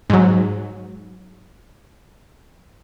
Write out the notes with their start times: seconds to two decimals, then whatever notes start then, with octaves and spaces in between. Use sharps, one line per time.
0.10 G#2 F#3